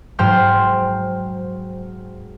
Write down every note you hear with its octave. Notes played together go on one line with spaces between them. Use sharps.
G#2 F#3 C5 G5 C6 F6